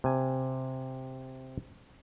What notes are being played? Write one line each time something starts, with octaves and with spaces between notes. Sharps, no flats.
C3 G#5